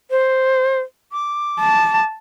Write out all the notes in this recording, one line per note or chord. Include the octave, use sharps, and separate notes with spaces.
C5
D6
A5